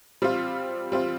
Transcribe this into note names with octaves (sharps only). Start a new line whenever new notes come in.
G3 C4 F4
G3 C4 F4